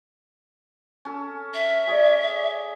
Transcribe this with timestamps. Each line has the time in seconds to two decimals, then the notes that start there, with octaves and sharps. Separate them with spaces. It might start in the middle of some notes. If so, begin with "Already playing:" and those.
1.05 C#4 A4
1.54 E5
1.87 G#4 C#5 D5